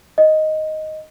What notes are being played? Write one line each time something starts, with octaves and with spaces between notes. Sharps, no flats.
D#5